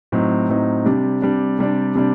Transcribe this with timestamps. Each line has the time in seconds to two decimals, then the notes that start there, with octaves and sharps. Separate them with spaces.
0.12 A2 F#3 C4 D#4
0.49 A2 F#3 C4 D#4
0.85 C3 G3 D4
1.22 C3 G3 D4
1.59 C3 G3 D4
1.95 C3 G3 D4